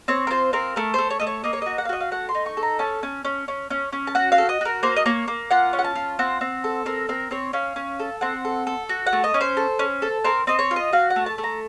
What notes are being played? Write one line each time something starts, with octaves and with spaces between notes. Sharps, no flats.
C4 C#5
A#4
F4 C5
C4 A#4
A3 A#4
A3 C5
C#5
A3 D#5
C#5
A#3 D#5
C#5
F#4 D#5
F#5
F5
F#4 D#5
F5
A3 F#5
C6
D#4
C#6
A4
A#5
C#4 A5
C#4
C#4
C#4
C#4
C#4
A5
F#4 F#5
F5
A4
D#5
F#4 A#4
A#3 C5
D#5
A#3 C#5
A#3
F4 F#5
C#4
F#5
A5
F4
C4 F#5
C4
A4
C4 A#4
C4 A#4
C4 C#5
C#4 F5
C#4
A4
C4 F#5
A4
A4
F#4
F#5
A3
D#5
C#4
C5
A4
C#4
A4
C4 A#4
C4 D#5
C#5
F4
D#5
F#4 F5
F#5
A3
A5
A3
A#5